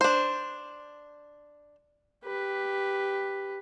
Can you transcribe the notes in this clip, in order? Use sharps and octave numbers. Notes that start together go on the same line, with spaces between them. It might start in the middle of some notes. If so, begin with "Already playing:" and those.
D4 C5
G4 B4